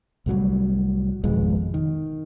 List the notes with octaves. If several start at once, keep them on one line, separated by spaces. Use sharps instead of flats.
C2 A2 F#3 G3
G#1 F2 B2 G#3
D#3